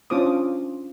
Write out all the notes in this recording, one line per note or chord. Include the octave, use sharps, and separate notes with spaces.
C#4 D4 F4 C5 D6 D#6